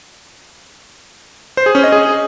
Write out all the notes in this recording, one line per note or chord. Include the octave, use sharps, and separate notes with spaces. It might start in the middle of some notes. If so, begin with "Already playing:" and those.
C5
G#4
C#4
D#5
G#4